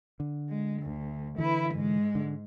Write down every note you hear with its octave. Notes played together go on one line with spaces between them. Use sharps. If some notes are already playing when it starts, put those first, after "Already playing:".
D3
G#3
D2
D3 E3 E4 B4
G#2 G#3
D3